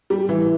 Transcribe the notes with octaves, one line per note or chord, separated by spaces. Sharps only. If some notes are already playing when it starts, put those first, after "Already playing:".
G3
E3